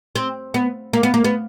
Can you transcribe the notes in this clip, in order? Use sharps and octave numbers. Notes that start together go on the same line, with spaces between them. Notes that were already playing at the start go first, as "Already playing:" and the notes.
C4
B3
A#3
B3
A#3
B3